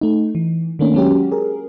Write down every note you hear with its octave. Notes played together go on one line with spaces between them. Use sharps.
A3 D#4
E3
D#3 A3 A#3 C#4 D4
F#3 G#3 C#4 F#4 G4
G#4 A#4